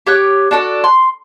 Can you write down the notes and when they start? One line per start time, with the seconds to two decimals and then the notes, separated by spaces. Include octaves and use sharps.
0.07 G4 C#5 G5 F#6
0.51 D4 F#4 A4 D5
0.84 C6